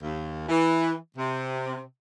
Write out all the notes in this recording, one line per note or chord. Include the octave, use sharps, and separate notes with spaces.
D#2
E3
C3